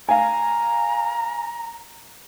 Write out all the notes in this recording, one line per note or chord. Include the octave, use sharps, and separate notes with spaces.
F5 G#5 A#5